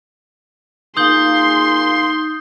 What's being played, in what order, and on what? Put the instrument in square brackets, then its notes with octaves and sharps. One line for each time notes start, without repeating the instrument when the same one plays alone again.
[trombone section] A#3 F4 G#4 [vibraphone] D#4 [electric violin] C6 [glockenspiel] D#6 G6 G7